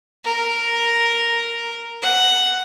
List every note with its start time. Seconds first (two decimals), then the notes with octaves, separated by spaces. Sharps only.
0.25 A#4
2.02 F#5